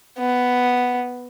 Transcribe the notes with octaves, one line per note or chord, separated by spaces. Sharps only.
B3